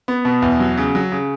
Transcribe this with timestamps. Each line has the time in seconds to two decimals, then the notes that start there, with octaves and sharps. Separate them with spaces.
0.08 B3
0.25 B2
0.42 E2
0.60 F#3
0.77 C#3
0.95 F#3
1.12 C#3